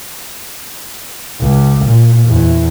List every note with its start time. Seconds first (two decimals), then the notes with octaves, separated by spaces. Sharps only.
1.41 C#2
1.85 A#2
2.25 E2